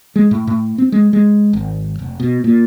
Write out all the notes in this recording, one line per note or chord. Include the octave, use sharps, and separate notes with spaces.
G#3
A2
A2
C4
G#3
G#3
G#1
F1
B2
A#2